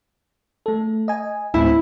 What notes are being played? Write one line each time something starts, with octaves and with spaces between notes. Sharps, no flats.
A3 A4
D#5 G#5
D2 A2 C4 E4